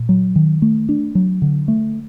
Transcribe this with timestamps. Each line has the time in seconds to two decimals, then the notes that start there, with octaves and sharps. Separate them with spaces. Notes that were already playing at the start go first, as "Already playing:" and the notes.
Already playing: A#2
0.09 F#3
0.36 D#3
0.62 A3
0.89 D4
1.15 F#3
1.42 D3
1.68 A3